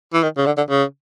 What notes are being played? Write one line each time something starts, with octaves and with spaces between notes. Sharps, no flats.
E3
D#3
C#3
D3
D3
C#3